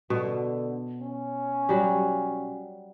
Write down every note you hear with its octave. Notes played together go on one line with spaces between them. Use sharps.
B2 D3
C#4
F#3 G3